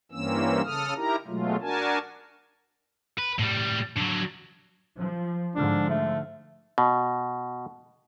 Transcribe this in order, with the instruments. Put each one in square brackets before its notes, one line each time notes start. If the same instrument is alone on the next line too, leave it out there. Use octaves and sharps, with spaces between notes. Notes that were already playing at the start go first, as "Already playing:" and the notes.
[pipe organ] G2 E3 A#3 C4 C#4 E6
C#3 A4 D#6 F6
D#4 E4 G4 A#4 A#5
B2 F#3 G#3 A3 F4
D4 F#4 A#4 G#5 A5
[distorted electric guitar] B4
A2 G3
D3 F#3
[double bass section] F3
[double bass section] G#2 D3 F3 [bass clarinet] D4
[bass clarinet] A3
[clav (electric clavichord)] B2